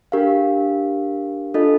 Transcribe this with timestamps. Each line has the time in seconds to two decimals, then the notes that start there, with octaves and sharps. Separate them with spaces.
0.12 D4 G4 A#4 F5
1.54 D4 F4 A4 D#5